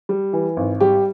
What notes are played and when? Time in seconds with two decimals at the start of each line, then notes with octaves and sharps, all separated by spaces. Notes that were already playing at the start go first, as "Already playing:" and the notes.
0.09 G3
0.33 E3
0.57 G#1
0.80 G3 G4